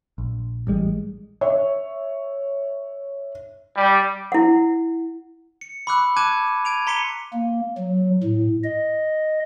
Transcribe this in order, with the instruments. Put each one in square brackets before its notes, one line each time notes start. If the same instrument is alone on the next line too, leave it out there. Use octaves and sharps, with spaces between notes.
[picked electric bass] A#1
A1 G3 G#3
[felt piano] C#5 E5
[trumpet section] G3
[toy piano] E4 F#5
[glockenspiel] C#7
B5 C#6 D6 E6 F#6
A5 D6 F#6 G#6 D#7
G#6 D7 D#7 F7
A#5 C6 B6 C#7 D#7 G7
[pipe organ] A#3
F#3
A2
D#5